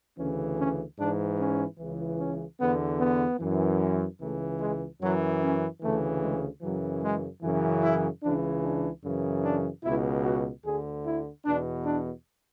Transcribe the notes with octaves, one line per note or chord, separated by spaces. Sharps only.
D2 C#3 E3 C#4
C#4
G#2 E3 D4
C#4
C#2 C#3 E3
C#4
E2 D3 B3
B3
F#2 E3
C#2 C#3 E3 A3
G#3
F#2 E3 F#3
C#4
D2 C#3 E3 A3
G#3
F#2 C#3 E3 F#3
G#3
F#2 C#3 E3
E4
C#2 C#3 E3 D4
D4
F#2 C#3 E3
D4
C#2 B2 E4
F#4
D2 D3 G#4
E4
E2 B2 D4
D4